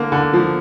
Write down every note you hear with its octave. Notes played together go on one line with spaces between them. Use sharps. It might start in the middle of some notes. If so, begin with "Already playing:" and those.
Already playing: D3 A#3
D3
F3